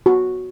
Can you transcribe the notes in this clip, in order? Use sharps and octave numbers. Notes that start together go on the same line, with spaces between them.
F#4